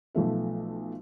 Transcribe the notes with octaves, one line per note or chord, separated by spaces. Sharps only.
B1 F3 A3 E5